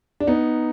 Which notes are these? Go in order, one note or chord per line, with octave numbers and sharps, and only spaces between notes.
D4
B3 D#4